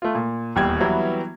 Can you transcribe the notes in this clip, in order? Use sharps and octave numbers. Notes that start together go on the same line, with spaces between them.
A3 F4
A#2
D#1 E2 G3 G5 G#6
E3 F#3 G3 B3 E4 F#4